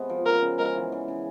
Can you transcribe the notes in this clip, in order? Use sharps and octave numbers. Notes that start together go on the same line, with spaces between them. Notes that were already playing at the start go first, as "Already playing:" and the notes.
Already playing: C3 G#3 B3
F3
C#3 A#4
C#3
G#3 A#4
E3
C#3
C#3